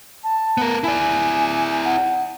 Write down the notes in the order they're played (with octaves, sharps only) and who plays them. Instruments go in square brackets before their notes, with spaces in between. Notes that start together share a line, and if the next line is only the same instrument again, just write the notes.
[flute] A5
[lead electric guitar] B3 A#4
[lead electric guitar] E4 D5 [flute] G#5
[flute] F#5